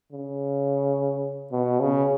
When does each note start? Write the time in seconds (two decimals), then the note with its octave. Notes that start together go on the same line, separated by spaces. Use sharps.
0.12 C#3
1.52 B2
1.80 C#3